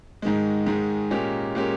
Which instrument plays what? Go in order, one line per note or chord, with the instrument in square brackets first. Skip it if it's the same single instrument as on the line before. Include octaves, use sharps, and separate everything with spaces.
[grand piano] G#2 D#3 G#3
G#2 D#3 G#3
A#2 G#3 C#4 G4 A#4
A#2 G#3 C#4 G4 A#4